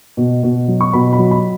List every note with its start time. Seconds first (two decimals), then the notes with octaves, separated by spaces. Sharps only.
0.17 B2
0.43 B2
0.68 F#3
0.81 C#6
0.93 B2 B5
1.13 B5
1.18 F#3
1.31 B5